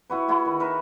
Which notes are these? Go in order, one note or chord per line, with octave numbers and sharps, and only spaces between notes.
E4 F#4 B4
E4 F#4 G#4
D#3
A#4 B4 E5 B5